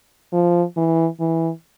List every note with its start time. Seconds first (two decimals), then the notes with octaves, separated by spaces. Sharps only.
0.33 F3
0.77 E3
1.20 E3